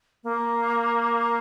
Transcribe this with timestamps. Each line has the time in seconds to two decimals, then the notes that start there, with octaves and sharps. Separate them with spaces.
0.24 A#3